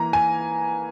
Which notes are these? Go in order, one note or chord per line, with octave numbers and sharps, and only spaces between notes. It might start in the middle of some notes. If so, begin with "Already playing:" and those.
Already playing: E3 A#3 A#5
G#5